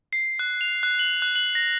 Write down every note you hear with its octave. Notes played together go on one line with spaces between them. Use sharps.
C7
F#6
F7
F#6
F#7
F#6
F#7
A#6